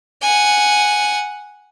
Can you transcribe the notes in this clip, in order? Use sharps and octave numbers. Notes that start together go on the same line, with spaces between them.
F#5 G#5